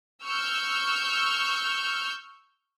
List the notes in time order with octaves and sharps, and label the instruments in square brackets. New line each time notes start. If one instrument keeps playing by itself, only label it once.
[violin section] C#6 E6 F6 G6